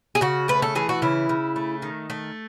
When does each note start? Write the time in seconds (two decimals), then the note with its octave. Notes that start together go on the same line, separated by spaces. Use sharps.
0.15 G#4
0.21 C#3 F#4
0.48 A3 B4
0.62 A4
0.75 E3 G#4
0.89 F#4
1.02 C#3 E4
1.29 C#3
1.56 A3
1.82 D#3
2.10 A3